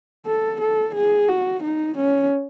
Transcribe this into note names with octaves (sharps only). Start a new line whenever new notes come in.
A4
A4
G#4
F#4
D#4
C#4